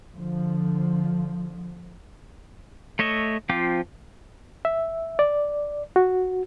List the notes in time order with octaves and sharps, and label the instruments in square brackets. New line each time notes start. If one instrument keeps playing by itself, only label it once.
[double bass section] D3 F3
[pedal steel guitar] A3 C#5 D#5 E5
F3 C4 F4 G5 D6
[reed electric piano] E5
D5
F#4